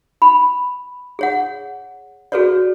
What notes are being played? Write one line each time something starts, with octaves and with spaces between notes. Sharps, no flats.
B5
G#4 C#5 F#5
F#4 G#4 A4 B4 C#5 D5